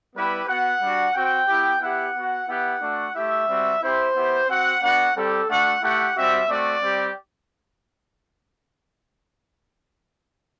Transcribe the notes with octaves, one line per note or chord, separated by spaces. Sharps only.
G3 B3 E4 G4 B4
B3 F#4 F#5
G3 D4 F#4
C4 F#4 G5
B3 E4 G4
B3 E4 G4 F#5
B3 F#4
B3 E4 G4 F#5
A3 D4 F#4
A3 E4 G4 E5
G3 C4 F#4
C4 E4 G4 C5
B3 E4 G4
C4 F#4 F#5
B3 D4 F#4 F#5
G3 C4 G4 A4
A3 D4 F#4 F#5
A3 E4 G4 F#5
G3 C4 F#4 E5
A3 C4 F#4 D5
G3 C4 G4